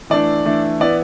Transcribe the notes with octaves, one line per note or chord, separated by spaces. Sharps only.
E3 A3 D4 D5
E3 A3 D4
E3 B3 E4 D5